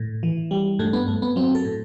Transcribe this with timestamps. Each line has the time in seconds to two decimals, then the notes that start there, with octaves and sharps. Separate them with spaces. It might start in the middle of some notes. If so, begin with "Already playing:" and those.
Already playing: A2
0.23 E3
0.51 G3
0.79 G2 A3
0.93 B3
1.08 G2 A3
1.22 B3
1.36 F#3 C4
1.55 A4
1.65 A2